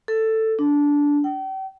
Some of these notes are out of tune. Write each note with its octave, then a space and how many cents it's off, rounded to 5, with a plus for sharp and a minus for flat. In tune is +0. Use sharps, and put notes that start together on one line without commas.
A4 +10
D4 -15
G5 -40